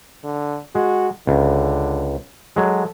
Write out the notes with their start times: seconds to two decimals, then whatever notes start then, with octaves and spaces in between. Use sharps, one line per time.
0.24 D3
0.75 G#3 F#4
1.27 C#2 D3
2.56 F#3 G#3 A4